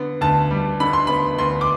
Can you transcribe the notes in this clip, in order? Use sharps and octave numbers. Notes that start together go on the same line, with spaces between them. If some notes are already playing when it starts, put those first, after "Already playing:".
Already playing: D3 B3
D2 A5
G3
D3 B5
C6
B3 B5
D2 C6
D6